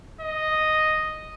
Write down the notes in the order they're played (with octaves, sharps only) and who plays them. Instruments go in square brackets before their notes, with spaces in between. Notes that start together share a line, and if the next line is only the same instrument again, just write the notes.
[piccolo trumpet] D#5